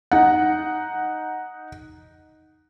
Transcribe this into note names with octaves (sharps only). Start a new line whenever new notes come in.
D#4 F#5